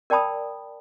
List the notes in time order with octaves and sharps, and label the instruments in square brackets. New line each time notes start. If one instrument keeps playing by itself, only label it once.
[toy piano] A#4 D5 G5 A5 B5 D#6